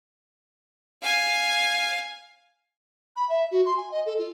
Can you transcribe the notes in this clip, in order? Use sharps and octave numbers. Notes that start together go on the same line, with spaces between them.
F5 G#5
B5
E5
F#4
C6
G#5
D#5
A4
F4